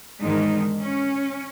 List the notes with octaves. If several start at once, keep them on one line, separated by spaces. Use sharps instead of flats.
E2 G#2 D3 D#3 G#3 D#4
C#4